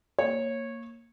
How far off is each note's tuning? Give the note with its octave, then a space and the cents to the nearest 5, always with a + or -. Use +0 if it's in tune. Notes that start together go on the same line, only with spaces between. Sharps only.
A#3 -10 C#5 -15